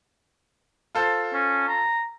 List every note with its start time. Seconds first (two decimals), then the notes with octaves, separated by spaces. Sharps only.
0.95 F4 A4 C5
1.33 C#4
1.68 A#5